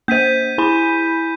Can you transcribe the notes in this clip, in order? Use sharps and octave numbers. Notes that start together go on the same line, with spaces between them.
A#3 C5 G6 B6 D#7
E4 G#5 B5